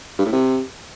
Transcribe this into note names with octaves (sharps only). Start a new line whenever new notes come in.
G2
A2
C3